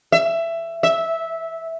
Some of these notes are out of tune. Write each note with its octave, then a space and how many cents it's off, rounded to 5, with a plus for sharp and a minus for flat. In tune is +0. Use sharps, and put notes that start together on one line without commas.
E5 +15
E5 -10